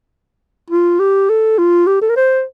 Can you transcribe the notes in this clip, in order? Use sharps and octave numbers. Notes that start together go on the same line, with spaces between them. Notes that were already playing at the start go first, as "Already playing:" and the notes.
F4
G4
A4
F4
G4
A4
A#4
C5